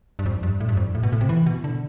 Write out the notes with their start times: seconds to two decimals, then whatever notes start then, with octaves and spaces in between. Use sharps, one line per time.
0.19 G2
0.26 F2
0.43 G2
0.60 A2
0.69 G2
0.77 F2
0.95 A2
1.03 B2
1.12 A2
1.21 C3
1.29 E3
1.46 B2
1.64 D3